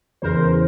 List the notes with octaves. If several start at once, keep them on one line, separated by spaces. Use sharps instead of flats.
E2 C#3 E3 A#4 C5